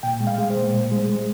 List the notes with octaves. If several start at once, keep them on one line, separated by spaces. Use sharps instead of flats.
A#2 G5
G#3
F5
G#3
C5
A#2
A#2
G#3
G#3